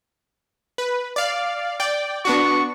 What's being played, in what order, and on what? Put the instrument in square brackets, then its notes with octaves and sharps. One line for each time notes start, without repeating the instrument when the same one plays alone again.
[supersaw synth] B4
D5 F5
D5 G5
[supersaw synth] B3 D4 F#4 [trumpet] C#6